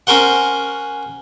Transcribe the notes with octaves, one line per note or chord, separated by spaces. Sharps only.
C#4 A#4 C5 F#5